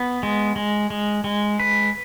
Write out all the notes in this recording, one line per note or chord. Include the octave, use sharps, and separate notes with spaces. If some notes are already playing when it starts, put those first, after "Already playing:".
Already playing: B3
G#3
G#3
G#3
G#3
B4